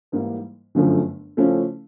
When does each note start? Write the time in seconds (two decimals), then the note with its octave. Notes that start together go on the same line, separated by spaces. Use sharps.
0.12 G#2 E3 G3 A#3
0.75 G1 F#2 D3 F3 A3
1.37 C#3 F3 A3 C#4 E4